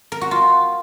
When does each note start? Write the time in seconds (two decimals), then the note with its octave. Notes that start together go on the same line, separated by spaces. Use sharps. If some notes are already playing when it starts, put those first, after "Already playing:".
0.12 A#4
0.21 F#4
0.31 F4